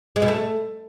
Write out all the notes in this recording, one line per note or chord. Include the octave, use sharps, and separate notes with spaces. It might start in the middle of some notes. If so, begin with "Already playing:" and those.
G#3
B2
A3